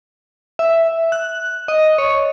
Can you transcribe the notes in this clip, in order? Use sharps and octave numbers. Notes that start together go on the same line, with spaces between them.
E5
F#6
D#5
C#5